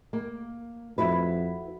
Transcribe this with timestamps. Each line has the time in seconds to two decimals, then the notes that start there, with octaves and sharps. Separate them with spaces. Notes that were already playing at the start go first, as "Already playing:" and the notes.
0.13 A#3
0.98 F2 E4 F#4 B4